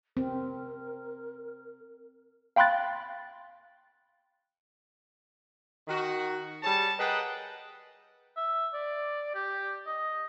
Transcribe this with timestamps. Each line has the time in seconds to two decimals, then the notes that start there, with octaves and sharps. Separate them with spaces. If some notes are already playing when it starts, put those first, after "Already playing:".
0.17 C4 A#4
2.56 F5 G5 B5 C6 F#6 A6
5.88 D#3 F#4
6.63 G3 G#4 C#5 A5
6.98 G#4 A#4 B4 D#5 F#5 G5
8.37 E5
8.74 D5
9.35 G4
9.86 D#5